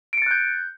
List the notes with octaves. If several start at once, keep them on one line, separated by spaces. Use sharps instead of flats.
F#6 G6 A6 C#7 D7